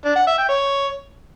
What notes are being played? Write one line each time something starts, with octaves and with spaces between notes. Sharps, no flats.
D4
F#5
E5
G5
C#5